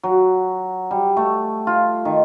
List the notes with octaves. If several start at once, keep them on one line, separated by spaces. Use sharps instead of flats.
F#3
G3
A3
F4
D#3